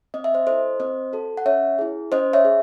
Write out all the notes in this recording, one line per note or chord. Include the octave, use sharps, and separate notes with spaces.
C4 D#5
E5
C5 D#5
E4 A4 C5 D#5
C4 C5 D#5
F#4 A4
F#5
C#4 C#5 E5
E4 G#4
C#4 C5 D#5
C#5 E5
G#4